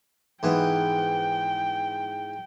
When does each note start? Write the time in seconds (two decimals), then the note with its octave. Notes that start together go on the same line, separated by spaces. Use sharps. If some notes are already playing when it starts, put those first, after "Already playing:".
0.43 G#2 E3 B3 G5